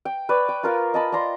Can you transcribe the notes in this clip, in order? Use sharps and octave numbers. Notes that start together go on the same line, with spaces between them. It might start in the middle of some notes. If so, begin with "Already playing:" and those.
G5
B4 C#5 D5
G5
F4 A#4 F5
D#5 A5 B5
D5 F5 A#5 C6